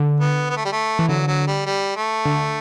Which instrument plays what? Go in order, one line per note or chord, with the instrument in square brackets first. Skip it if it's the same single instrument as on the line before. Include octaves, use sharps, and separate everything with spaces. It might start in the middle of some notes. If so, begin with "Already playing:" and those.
Already playing: [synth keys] D3
[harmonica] B3
B3
A3
G3
A3
[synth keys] E3
[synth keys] D3 [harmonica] F#3
[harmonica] F#3
G3
G3
A3
[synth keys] D3